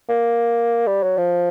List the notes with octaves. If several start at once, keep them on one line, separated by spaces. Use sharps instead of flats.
A#3
G3
F#3
F3